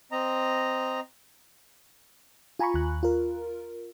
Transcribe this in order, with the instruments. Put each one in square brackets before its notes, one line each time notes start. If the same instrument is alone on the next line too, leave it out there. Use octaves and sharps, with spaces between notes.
[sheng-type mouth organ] C4 D#5 A#5
[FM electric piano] F4 G#5 A#5 B5 C#6
D#2 F#6
F4 A#4